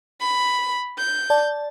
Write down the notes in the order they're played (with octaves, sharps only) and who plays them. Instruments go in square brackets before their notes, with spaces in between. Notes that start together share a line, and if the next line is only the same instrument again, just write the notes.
[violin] B5
G6
[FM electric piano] D5 A5